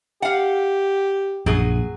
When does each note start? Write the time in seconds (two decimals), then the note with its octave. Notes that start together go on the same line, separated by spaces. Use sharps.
0.22 G4 F5 F#5
1.46 A#1 F#2 F#3 G#4